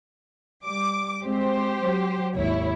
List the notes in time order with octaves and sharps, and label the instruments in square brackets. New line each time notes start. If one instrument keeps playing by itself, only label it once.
[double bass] G3 [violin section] D6
[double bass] G#3 C4 [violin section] G4 C5
[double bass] F#3
[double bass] G#1 D#2 [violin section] E4 C#5